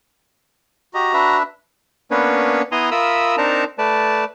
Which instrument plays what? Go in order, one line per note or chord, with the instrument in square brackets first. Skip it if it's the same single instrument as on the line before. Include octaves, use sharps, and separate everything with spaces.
[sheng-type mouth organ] F#4 A#5 [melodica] G4 D#5
[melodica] D4 B4 E5
[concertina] A#3 B3 C#4 D4 B4 C#5
B3 E4 G#5 A#5 C6 D#6
F4 A#4 E5 B5 D#6 E6
C4 D4 D#4 A#4 A5 A#5
A3 B4 D5 A5